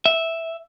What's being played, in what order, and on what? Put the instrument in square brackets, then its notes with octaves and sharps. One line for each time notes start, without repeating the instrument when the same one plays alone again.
[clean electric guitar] E5